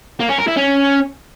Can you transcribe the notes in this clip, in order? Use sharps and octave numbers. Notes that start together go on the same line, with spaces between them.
A#3
C#4
A#4
E4
C#4